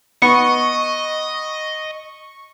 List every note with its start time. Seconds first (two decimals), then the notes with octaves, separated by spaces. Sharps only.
0.22 B3 D#5 C#6